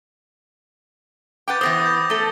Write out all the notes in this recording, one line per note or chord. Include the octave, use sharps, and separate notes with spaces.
B4 F#5 G5 D6 G6 A6
E3 B3 C5 D#6 A#6
G6
A3 A4